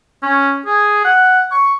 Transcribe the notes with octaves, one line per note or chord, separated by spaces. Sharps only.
C#4
G#4
F#5
C#6